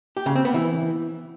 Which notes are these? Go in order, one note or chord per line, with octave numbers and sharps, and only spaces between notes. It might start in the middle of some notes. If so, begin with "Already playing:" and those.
G4
C#3
C4
B3
E3